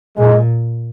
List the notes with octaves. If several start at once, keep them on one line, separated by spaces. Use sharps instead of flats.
A#2 G#3